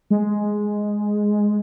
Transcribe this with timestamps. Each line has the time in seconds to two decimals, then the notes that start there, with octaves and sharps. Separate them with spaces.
0.10 G#3